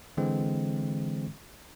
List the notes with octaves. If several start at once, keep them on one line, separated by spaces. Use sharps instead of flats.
D3 E3 G#3 C4